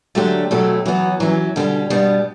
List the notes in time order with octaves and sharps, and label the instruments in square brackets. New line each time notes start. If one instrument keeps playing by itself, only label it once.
[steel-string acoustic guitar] D3 A3 D4 G4 [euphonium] F#3
[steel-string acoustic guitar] B2 A3 E4 G4 [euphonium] F#3
[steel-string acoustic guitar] E3 B3 F#4 [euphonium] F#3
[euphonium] E3 [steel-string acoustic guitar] F#3 C#4 G4
[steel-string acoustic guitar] B2 G3 C#4 G4 [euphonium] D3
[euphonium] G2 [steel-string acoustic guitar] B2 G3 B3